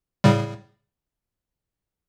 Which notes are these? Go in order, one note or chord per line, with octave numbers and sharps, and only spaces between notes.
A2 C#3 G3